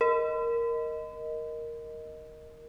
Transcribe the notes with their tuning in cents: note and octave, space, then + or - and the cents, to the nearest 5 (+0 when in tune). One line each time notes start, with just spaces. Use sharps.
A#4 +0 D#5 +0